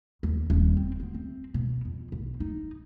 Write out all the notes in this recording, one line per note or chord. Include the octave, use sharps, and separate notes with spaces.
D#2
D#1
C4
D2
C4
B2
F2
B1
D#4